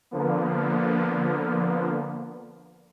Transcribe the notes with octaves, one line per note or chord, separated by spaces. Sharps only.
D3 F3 A#3 B3